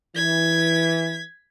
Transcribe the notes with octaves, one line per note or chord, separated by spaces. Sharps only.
E3 G#6 B6